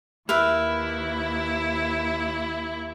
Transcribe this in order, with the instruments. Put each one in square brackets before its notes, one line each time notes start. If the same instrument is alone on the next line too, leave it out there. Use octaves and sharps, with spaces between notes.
[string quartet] D#2 E4 [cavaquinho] A#4 B4 E5